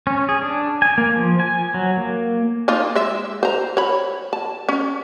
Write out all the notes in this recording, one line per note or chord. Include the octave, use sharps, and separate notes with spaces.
C#4
G#4
D4
G#5
A#3
F3
G#5
F#3
A#3
A#3 D#4 F4
G#3 E5
C5 A#5
C#5 B5
A5
C#4